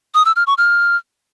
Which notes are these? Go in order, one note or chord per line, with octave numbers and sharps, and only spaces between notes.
D#6
E6
F6
C#6
F6